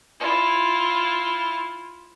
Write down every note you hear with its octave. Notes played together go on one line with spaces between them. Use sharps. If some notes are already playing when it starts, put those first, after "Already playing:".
E4 F4